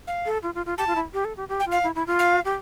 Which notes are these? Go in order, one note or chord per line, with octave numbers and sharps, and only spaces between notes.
F5
A4
F4
F4
F4
G4 A5
F4
E4
G4
A4
G4
G4
G5
F4
F5
E4
E4
F4
F5
G4